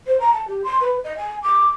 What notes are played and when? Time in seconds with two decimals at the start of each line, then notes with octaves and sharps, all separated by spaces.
0.07 C5
0.20 A#5
0.33 A5
0.48 G4
0.64 C6
0.81 B4
1.04 D#5
1.17 G#5
1.43 D6